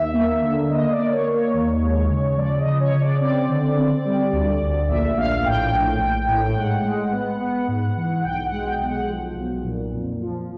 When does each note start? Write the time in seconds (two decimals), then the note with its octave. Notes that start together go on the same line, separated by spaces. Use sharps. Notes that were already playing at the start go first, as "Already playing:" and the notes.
Already playing: D#2 E5
0.14 A#3
0.41 D3
0.64 E5
0.70 A#3 D#5
0.91 D5
0.98 A#3
1.11 C#5
1.25 A#3
1.32 C#5
1.53 D#2
1.82 G#3
2.09 C#3
2.37 F3 D5
2.59 D#5
2.66 C#3
2.80 C#5
2.94 C#3
3.01 D5
3.21 C4 D5
3.49 D3
3.77 C4
4.05 G3
4.33 D2
4.62 D2
4.88 A#1 E5
5.18 A#1 F5
5.45 A2 G5
5.73 A#1
6.00 A#1
6.28 A2
6.57 G#2 F#5
6.85 G#3
7.12 B3
7.40 B3
7.68 G#2
7.97 E3
8.24 B1 G5
8.45 F#5
8.52 G#3
8.66 G5
8.78 B1 G5
8.87 F#5
9.07 F3
9.36 B1
9.64 A#2
9.92 F2
10.20 F3